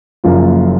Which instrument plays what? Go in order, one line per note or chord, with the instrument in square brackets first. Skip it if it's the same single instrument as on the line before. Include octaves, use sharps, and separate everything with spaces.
[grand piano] F#1 F#2 F3 A#3 F4